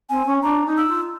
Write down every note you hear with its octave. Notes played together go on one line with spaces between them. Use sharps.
C4 G#5
C#4
D4 A#5
D#4
E6
F4